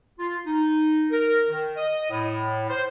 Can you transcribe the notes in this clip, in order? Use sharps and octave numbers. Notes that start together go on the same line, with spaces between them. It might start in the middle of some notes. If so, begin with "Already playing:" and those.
F4
D#4
A#4
D#3
D#5
A2
C5